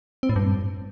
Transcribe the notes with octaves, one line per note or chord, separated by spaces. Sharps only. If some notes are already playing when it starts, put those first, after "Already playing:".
C4
A2
G2